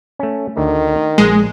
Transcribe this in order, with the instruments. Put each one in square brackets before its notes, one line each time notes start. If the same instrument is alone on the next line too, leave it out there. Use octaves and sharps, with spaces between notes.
[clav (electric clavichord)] A3 C#4
[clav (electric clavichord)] D2 D3 [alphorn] D#3
[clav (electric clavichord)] A#1 [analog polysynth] G#3